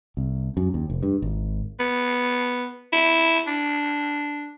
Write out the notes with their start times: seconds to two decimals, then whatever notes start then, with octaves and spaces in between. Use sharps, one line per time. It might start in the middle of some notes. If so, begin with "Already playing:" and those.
0.17 C2
0.57 F#2
0.74 D#2
0.90 F1
1.03 G2
1.22 G#1
1.79 B3
2.92 E4
3.47 D4